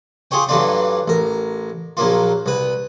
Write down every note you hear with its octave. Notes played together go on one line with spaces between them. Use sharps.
F4 G4 G#4 C#5 G5
G2 E3 F#3 A3 D4 F4
A1 A#4
A#1 F#3 A#3 F4
C2 B4